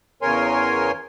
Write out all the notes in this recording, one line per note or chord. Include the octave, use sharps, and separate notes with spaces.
E2 C#3 A#4 C#5 G#5 C6